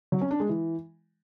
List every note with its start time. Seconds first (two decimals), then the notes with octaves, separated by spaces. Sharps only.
0.12 F#3
0.21 C#4
0.31 D4
0.40 G#3
0.49 E3